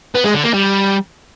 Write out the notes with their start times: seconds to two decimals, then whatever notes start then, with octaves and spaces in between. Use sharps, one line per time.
0.15 B3
0.24 G#3
0.34 D3
0.44 A#3
0.54 G3